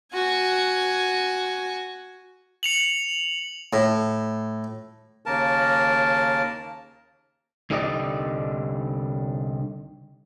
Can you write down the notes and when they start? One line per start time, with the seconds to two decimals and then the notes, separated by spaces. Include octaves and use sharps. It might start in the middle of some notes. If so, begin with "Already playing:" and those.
0.13 F#4 G#5
2.63 C#7 F7 F#7
3.73 A2
5.26 D#2 C#3 A#3 A#4 A5
7.70 C2 D3 D#4 G4 D5 D#5